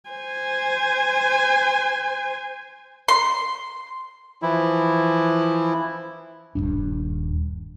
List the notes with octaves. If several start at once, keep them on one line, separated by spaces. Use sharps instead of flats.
C5 G#5
C6
E3 F3 E4
D#1 G#1 G2 D4